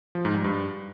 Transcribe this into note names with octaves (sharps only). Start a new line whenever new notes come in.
F3
G#2
G3
G2